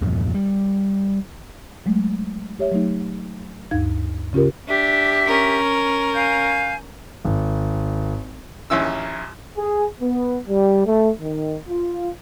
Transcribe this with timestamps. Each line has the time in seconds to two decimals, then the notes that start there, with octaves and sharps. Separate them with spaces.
0.01 E2 G2 A#2 F3
0.34 G3
1.86 F#3 G#3 A3
2.59 G4 C#5 E5
2.72 F#3 A3 D#4
3.71 D2 G2 D#4 F5 G#6
4.33 C#3 C#4 F4 G4 A#4
4.67 D4 G4 E5
5.26 C#4 A#4
6.14 F5 G#5 G6
7.25 G#1
8.70 A#1 D#2 C#4 E4 E6
9.57 G#4
10.01 B3
10.47 G3
10.86 A3
11.21 D#3
11.68 F4